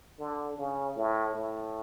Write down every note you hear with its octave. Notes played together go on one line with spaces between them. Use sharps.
D3
C#3
A2
A2